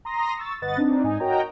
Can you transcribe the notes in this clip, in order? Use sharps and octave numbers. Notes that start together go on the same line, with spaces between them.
A#5 C6 D#6 A#6
C#6 E6 A6
G1 B4 D#5 F#5 A6
C4 D4 D#4
G#2 D#4 G#5
F#4 A#4 C#5 D#5 G5 A#5